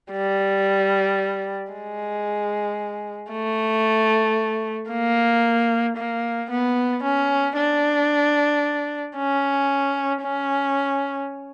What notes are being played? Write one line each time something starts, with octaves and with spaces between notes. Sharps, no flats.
G3
G#3
A3
A#3
A#3
B3
C#4
D4
C#4
C#4